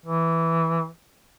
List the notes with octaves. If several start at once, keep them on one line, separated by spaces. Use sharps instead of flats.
E3